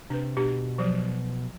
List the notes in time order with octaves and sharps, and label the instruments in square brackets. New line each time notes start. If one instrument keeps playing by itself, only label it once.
[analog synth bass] C3 [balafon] D4 B4
[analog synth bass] B2 [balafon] D4 G4
[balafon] F3 F#3